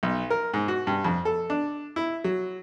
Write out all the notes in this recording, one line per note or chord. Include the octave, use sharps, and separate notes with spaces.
B1
A#4
G#2
F#4
G2
F2
A4
D4
E4
F#3